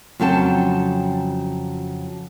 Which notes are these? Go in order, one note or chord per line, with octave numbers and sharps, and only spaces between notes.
F2 C#3 F#3 A4 G5 A5